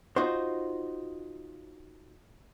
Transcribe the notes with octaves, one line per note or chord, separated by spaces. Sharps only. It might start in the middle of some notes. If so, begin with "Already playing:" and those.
D#4 F4 F#4 C5